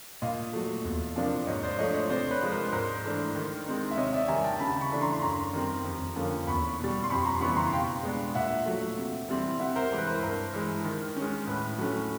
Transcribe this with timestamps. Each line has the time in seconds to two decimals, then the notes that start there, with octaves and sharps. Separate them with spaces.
0.22 A#2 D#5 F5
0.53 F#3 A3
0.85 E2
1.16 C3 F3 A#3 D4
1.47 G#2 C#5 D#5
1.63 C5 D5
1.79 F3 A3 D4 C#5 D#5
1.94 C#5 D#5
2.10 C3 C5 D5
2.31 B4 C#5
2.42 F3 G#3
2.51 A#4 C5
2.72 G#2 A#4 C5
3.04 E3 A3 D4
3.35 D#3
3.66 G#3 C4 D#4
3.91 E5
3.97 C3 C#5 D#5
4.13 D5 E5
4.28 D#3 G3 G#5 A#5
4.44 G5 A5
4.60 C#3 A5 B5
4.81 B5 C#6
4.91 E3 A3 D4
5.02 A#5 C6
5.22 F#2 A#5 C6
5.53 D#3 G3 C4
5.84 F2
6.16 D3 F3 A#3 C#4
6.47 E2 B5 C#6
6.79 B2 G3
7.04 C6
7.10 F2 B5 C#6
7.25 A#5 C6
7.41 C#3 E3 G3 B3 B5 C#6
7.56 A#5 C6
7.72 B2 F5 G5
8.03 G#3 B3 D4
8.35 A#2 E5 F#5
8.66 F#3 A3
8.98 C3
9.29 E3 G3 C4
9.60 C3 E5 F#5
9.76 A#4 C5
9.92 E3 G#3
9.97 B4
10.07 A#4 C5
10.23 G2 A#4 C5
10.54 E3 G#3
10.85 D#3
11.16 G#3 C#4
11.47 A2 B4
11.78 F#3 A3 C#4